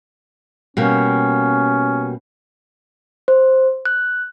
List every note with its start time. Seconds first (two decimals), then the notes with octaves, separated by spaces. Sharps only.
0.77 B2 G3 A#3 C#4
3.28 C5
3.85 F#6